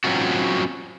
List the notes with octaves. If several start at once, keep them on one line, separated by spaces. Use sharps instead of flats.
F#3 C4 C#4 F4 F#4